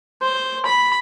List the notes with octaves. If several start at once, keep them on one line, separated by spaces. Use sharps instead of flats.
C5
B5